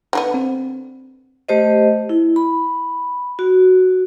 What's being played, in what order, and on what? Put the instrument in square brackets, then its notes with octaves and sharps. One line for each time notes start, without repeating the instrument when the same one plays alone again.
[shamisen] D3 A#3 B3
[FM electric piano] C4
[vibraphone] A3 G4 C5 D#5
E4
B5
F#4